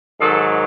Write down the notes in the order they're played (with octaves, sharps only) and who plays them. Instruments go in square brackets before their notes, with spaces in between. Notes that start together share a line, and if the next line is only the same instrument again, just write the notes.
[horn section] G#2 D#3 F#3 A4